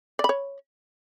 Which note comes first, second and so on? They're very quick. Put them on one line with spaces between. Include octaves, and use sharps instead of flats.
D5 B5 C#5